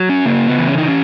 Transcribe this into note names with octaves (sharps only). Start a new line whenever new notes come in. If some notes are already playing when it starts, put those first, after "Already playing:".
Already playing: F#3
C#4
C#3 A#3
B3
E3
C#4
D#4
C#4